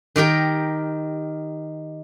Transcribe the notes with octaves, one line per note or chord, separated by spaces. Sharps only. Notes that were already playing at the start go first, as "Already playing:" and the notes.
D#3 G4 A#4 G5